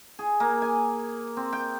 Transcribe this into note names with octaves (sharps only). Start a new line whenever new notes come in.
G#4
A#3
G#5
C4
G5